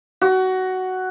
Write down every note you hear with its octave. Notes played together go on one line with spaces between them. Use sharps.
F#4